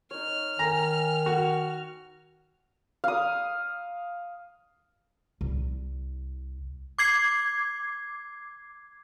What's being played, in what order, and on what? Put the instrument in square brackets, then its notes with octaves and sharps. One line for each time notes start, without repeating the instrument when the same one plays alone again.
[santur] D#4 C#5 [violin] F6
[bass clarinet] D#3 [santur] G#5 [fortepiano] A#5
[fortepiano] F#4
[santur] F5 D#6
[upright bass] C2
[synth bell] D6 G#6 C7